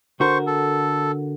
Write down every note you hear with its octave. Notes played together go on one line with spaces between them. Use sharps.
D3 F#4 A#4 C5 C#6
A4